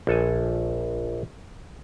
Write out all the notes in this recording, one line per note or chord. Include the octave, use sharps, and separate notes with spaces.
A#1 A4 G#5